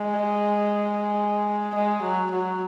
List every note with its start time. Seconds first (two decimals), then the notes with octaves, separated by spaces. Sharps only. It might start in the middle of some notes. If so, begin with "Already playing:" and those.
Already playing: G#3
1.75 G#3
2.02 F#3
2.31 F#3